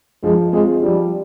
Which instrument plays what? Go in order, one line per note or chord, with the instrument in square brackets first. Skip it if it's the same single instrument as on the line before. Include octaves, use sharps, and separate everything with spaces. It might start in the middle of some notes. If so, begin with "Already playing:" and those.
[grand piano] F3 [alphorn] G#3
[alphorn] G#3 [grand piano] C4 F4 G#4
[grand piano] F3 [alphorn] G3